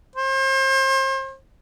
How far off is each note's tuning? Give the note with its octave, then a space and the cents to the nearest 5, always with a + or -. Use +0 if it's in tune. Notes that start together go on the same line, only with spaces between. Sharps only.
C5 +35